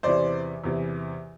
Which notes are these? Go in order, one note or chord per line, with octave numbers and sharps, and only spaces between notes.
E2 C3 E3 C5 D5
E2 C3 E3